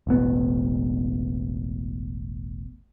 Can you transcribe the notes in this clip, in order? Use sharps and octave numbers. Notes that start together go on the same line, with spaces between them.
E1 A1 B3